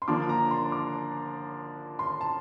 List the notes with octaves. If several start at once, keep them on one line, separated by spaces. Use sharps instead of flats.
C6
D3 F3 A#3 D4 D6
A#5
C6
D6
C6
A5